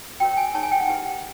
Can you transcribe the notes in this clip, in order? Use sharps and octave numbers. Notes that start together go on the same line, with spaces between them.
F#4 A#4 C#5 G5
G#5
D#4 G#4 C#5 A5
G#5
G5
F#5
E4 G4 B4